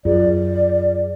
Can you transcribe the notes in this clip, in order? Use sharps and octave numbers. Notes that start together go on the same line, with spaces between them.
F#2 F4 G#4 D5